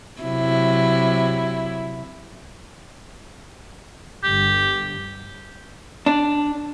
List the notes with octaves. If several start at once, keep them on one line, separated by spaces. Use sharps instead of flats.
C3 F#3 E4
G1 G4
D4